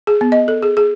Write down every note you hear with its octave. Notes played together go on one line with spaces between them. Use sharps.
G#4
B3
D#5
A4
G#4
G#4